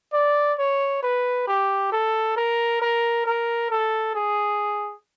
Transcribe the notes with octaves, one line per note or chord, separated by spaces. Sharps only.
D5
C#5
B4
G4
A4
A#4
A#4
A#4
A4
G#4